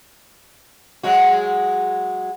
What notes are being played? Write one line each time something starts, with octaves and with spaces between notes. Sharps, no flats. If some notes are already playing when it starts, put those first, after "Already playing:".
F#3 G#3 F#4